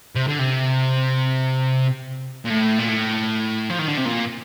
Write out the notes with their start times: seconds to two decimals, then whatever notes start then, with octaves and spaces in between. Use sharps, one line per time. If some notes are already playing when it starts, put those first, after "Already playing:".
0.15 C3
0.28 D3
0.39 C3
2.45 A#2
2.50 A2
2.79 A#2
2.89 A2
3.70 F3
3.79 D#3
3.88 D3
3.97 C3
4.06 A#2